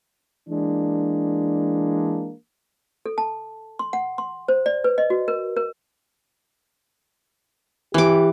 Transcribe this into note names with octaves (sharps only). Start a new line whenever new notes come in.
E3 G#3 A#3 D4
A4
A5
C6
F#5
C6
C5
D5
B4
D#5
F#4
A#4
A#4
E3 G4 D6